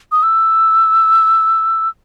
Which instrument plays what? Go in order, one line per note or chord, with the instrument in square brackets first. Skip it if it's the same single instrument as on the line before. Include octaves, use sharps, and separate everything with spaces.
[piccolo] D#6
E6